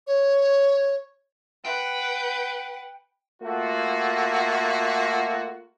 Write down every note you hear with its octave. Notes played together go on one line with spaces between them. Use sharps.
C#5
B4 F#5 G5
A3 A#3 F4 F#4